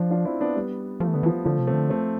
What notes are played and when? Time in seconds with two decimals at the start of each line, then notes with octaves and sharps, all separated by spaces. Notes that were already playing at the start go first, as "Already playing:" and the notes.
Already playing: F3 D4 F4
0.11 D4 F4
0.25 C4 E4
0.40 B3 D4
0.56 G3 B3
1.00 F3 A3
1.08 E3
1.14 D3 B3
1.23 E3
1.26 F3 A3
1.45 D3 F3 A3
1.59 C3
1.67 A3 C4
1.73 D3
1.90 A3 C4